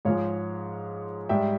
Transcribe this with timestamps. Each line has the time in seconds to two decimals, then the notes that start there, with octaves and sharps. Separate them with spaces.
0.05 G#2 F3 G#3 C#5 F5
1.29 G#2 G3 E5 G5